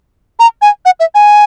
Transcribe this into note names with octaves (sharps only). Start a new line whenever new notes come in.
A#5
G#5
F#5
E5
G#5